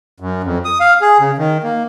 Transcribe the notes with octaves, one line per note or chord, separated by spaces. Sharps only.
F#2
F2
D#6
F5
G#4
C#3
D#3
A#3